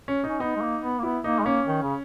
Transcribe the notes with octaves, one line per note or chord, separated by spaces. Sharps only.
C#4
C#4 D#4
B3 D#4
G#3
A#3
B3
A#3
B3 E4
A#3 D#4
G#3
A#3 C#4
D#3
C#3